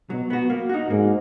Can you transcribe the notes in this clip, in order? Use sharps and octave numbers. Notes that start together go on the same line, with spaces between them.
B2 F#3
B3 F#4
A#3
D#4 F#4
G#2 A#3